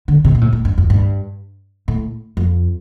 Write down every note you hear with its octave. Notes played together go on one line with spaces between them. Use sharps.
D3
C3
A#2
A2
A2
G2
F2
G2
A2
F2